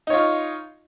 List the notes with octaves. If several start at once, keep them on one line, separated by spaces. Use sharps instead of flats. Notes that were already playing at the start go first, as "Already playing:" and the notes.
D#4 F4 C#5